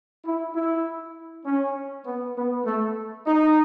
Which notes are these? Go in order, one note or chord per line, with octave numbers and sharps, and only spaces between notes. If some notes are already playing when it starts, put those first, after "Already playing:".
E4
E4
C#4
B3
B3
A3
D#4